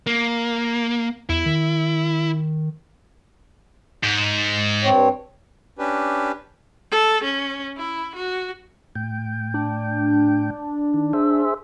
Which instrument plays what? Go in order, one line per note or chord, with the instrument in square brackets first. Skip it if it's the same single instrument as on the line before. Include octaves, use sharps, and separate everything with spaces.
[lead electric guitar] A#3
[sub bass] E2 [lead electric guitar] E4
[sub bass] D#3
[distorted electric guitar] G#2
[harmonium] G2 C4 C#5
[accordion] C#4 D4 G4 B4
[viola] A4
C#4
E4
F#4
[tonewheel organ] A2 G5
[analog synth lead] D4
[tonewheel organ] D#3
G#4 C5 E5